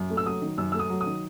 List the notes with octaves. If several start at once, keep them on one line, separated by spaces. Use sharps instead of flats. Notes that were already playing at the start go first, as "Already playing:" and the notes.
Already playing: F#2
A3
E6
F#3 D#6
D#3
F#2 E6
A3 E6
D#6
F#3
D#6
D#3